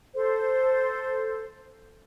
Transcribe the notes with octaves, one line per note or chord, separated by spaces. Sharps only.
A4 C5